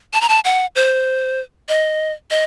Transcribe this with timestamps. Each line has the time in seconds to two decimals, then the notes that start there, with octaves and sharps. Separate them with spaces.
0.13 A5
0.21 A#5
0.29 A5
0.44 F#5
0.76 C5
1.69 D#5
2.31 D#5